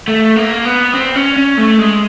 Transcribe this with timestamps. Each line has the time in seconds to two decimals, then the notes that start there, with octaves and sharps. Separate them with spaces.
0.08 A3
0.36 A#3
0.65 B3
0.94 C4
1.15 C#4
1.37 C#4
1.58 A3
1.79 G#3